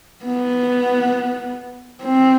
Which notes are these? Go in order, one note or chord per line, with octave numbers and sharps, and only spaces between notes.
B3
C4